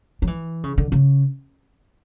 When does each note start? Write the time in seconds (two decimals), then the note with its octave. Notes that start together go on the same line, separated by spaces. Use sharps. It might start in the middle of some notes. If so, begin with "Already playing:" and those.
0.22 F#3
0.27 E3
0.64 C#3
0.78 D3
0.92 C#3